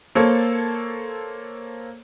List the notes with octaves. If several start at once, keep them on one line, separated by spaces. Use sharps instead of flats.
A#3 A4 C5 C#5